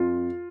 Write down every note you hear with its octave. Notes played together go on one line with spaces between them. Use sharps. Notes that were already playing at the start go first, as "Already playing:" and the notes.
Already playing: F2 F4